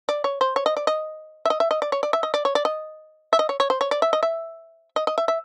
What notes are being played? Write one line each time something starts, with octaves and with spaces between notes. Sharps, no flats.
D5
C#5
C5
C#5
D#5
D5
D#5
E5
D#5
E5
D#5
D5
C#5
D5
E5
D#5
D5
C#5
D5
D#5
E5
D#5
C#5
C#5
C5
C#5
D5
E5
D#5
E5
D#5
D#5
E5
E5